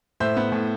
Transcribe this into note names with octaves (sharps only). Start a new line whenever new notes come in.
A2 C5 E5
B3
A2